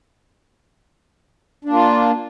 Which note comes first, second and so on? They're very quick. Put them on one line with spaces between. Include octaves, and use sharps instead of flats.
D4 A#3 F4